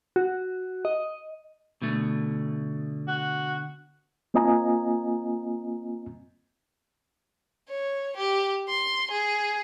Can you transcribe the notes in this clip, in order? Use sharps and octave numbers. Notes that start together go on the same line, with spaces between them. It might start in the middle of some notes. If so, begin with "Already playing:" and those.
F#4
D#5
B2 D3 A3
F#4
A#3 C4 F4 D#5 G#5 A#5
C#5
G4
C6
G#4